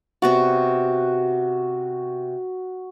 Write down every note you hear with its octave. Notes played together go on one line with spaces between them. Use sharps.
C3 B3 F#4 D5